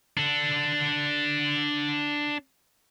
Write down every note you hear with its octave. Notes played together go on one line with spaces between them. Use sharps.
D4 A4